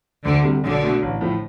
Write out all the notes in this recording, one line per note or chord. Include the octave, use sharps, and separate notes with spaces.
D2 D3
C3 G3
B1 D3
B2 A3
A1
A2 F3 A3